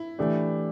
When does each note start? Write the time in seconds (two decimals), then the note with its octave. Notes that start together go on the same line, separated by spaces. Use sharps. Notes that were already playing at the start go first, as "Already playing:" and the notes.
Already playing: E4
0.18 E3 A3 D4 G4